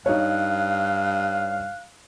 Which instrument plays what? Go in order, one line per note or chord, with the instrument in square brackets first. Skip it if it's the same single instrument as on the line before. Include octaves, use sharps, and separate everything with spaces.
[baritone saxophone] G2 [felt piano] D#4 C#5 [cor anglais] F5 [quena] F#6